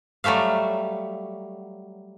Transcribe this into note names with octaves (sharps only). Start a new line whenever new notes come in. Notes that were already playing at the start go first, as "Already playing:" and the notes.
F#3 G3 A3 E5 F5